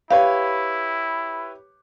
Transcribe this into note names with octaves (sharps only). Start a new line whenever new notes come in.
E4 G4 B4 C#5 F5